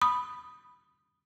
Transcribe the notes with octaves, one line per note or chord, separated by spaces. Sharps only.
B5 D#6